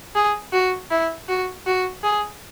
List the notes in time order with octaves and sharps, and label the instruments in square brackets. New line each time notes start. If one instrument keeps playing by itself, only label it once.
[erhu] G#4
F#4
E4
F#4
F#4
G#4